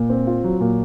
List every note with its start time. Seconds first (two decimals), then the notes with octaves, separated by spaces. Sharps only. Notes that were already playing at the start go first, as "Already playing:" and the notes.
Already playing: A#2
0.10 C4
0.27 F4
0.44 F#3
0.60 A#2